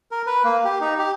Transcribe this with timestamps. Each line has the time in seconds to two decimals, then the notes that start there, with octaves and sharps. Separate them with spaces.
0.11 A#4
0.27 B4
0.44 A#3
0.65 G4
0.81 D#4
0.99 G4